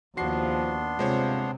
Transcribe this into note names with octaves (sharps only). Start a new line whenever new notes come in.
D#2 C3 F3 B3 D4 F#4 C6 C7
G2 C3 G#3 F4 C5 C#5